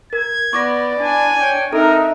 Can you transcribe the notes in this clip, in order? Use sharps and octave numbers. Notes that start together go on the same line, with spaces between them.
A#4 G#6
B3 E4 D5 C#6 D6 A#6
D4 G#5
C#5 D5 G5
C4 D4 D#4 A4 A#4 E5